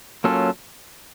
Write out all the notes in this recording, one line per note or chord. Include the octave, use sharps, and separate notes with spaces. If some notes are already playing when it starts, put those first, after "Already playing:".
F#3 A#3 C#4 F4 A4